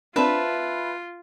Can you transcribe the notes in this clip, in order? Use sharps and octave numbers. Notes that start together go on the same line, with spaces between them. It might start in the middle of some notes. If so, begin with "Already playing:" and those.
C4 D4 F4 B4 E5 A5